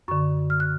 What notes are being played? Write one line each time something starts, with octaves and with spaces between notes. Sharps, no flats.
F#2 D3 C#6
F6
F#6